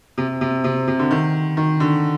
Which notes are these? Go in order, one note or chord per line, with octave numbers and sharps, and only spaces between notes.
C3
C3
C3
C3
D3
D#3
D#3
D3